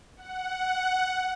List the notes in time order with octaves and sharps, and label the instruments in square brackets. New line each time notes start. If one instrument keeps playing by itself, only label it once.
[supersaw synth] F#5